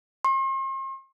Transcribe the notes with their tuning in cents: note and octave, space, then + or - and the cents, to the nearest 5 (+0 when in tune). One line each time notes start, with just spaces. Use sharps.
C6 +45